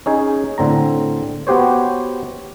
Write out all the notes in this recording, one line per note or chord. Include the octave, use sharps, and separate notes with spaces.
C#4 D#4 G#4
A2 D3 C4 A#5
B3 F#4 G4 C5 C#5